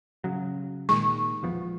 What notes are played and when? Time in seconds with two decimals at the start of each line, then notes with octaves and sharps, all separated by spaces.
0.24 C#3 F#3
0.89 A#2 D#3 G#3 C#6
1.43 E1 F3 B3